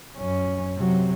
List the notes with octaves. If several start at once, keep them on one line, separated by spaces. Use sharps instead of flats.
F#2 C#4
C3 F#3